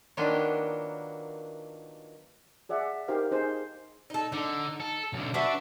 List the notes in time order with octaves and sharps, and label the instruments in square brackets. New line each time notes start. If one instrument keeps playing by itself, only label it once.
[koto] D#3 F#3 A#3 B3 D4 F4
[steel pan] G#4 D5 E5 F#5
D#4 G4 A#4 C5 F5
D#4 G#4 C5
[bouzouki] D#4 A4
[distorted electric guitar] D3 [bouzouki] D#4
[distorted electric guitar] A4
B1 D3
[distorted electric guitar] D4 [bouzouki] F#4 B4 E5